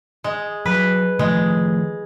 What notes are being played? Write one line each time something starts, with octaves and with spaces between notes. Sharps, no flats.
G#3
F#3 B4
D#3 F3 G#3 A3